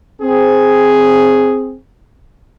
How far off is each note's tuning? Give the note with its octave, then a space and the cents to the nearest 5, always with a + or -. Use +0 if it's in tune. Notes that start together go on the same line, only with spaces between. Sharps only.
C4 +0 G#4 +0